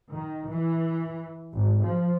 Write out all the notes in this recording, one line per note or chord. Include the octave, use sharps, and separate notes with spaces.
D#3
E3
G#1
F3